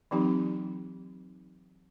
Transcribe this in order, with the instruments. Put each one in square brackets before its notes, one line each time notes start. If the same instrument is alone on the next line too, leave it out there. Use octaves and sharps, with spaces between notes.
[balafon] E3 F#3 C4 D#4 G4